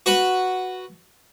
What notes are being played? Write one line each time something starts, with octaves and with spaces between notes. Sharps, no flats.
F#4 B4 F#5